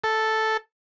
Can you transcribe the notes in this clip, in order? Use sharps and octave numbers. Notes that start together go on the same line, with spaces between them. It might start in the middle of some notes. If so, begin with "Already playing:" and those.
A4